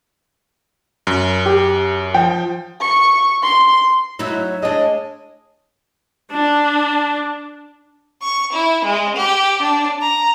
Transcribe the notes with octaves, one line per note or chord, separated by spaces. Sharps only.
F#2
G4
F3 G5
C#6
C6
F#3 D#4 E4 C#5
G#3 D4 D#5
D4
C#6
E4
G#3
G4
D4
A#5